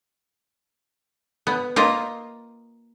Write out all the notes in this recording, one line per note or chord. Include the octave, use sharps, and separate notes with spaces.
B3
A#3 F4 D#5